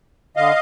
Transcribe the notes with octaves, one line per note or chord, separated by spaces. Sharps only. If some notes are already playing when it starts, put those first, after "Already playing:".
D3 D#5 F5